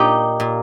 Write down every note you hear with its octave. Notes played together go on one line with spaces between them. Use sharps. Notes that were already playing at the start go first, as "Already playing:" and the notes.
Already playing: A#2 D#4 G4
A#2